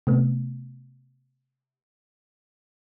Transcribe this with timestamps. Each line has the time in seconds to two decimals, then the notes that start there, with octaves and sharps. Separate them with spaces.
0.07 C3 A3 B3